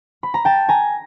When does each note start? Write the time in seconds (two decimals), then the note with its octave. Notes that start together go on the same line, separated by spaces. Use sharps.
0.23 B5
0.34 A#5
0.45 G5 A5
0.69 G#5 A#5